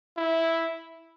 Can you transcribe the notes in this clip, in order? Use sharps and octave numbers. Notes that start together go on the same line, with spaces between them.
E4